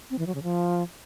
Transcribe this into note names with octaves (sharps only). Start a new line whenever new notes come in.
C4
E3
F#3
C#3
F3